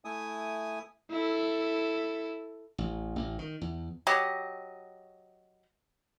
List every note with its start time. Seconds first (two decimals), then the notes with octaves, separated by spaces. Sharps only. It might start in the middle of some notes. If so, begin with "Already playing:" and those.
0.05 A3 E4 G#5 D#6
1.11 E4 A4
2.78 A1
3.16 A1
3.39 D#3
3.61 E2
4.07 F#3 G4 D#5